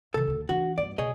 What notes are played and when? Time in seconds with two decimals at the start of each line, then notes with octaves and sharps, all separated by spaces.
0.14 C3 E3 A4
0.27 D2 D3
0.49 E3 D4 F#4
0.78 G2 B3 D5
0.98 B2 G#4 C#5 D#5